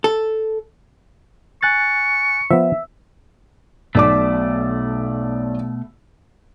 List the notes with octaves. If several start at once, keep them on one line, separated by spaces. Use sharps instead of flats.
A4
G#5 C#6 F#6 A6
F3 B3 E5
B1 B2 A3 D5 D6